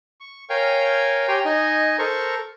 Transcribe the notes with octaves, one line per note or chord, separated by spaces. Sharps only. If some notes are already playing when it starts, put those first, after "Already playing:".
C#6
A#4 C#5 F5 G5 G#5
G4 C#5 G5 G#5 A#5 C6
D#4 D#5 G#5
A4 A#4 C5 C#6